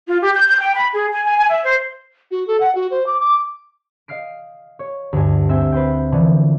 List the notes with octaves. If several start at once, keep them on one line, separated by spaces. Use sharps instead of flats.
F4
G4
G6
G6
G5
B5
G#4
G#5
G#5
G#5
E5
C5
F#4
A4
F#5
F#4
C5
D6
D6
D#5 F5 F6 C7 D7
C#5
D2 G2 G#5
C4 E5 G5 G#5
B4 C5 G5
D3 E3 F3